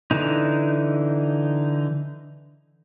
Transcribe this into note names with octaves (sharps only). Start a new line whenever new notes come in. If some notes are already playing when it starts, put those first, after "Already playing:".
D3 E3 D#4